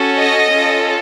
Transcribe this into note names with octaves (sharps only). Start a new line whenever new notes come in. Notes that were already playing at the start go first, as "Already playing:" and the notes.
Already playing: C#4 F#4 A4
D#5
C#4 F4 A4